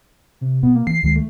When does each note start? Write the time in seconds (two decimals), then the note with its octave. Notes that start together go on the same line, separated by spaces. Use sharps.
0.41 C3
0.63 B2 B3
0.75 A#3
0.87 E3 C7
1.03 D2 D#3 G#3
1.16 A3